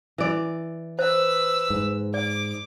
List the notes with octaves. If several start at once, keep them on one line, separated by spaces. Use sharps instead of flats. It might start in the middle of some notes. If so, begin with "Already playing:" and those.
E3 D5
B4 C5 E6
G#2
D5 D6